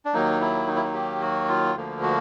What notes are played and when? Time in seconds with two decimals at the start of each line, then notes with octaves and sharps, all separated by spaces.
0.05 D4
0.13 D#2 D#3 F#3 A#3 D#4
0.41 E4
0.67 D#4
0.76 E4
0.84 D#4
0.94 G4
1.21 F#4
1.48 F4
1.75 D2 D3 F3 A#3
2.02 F#4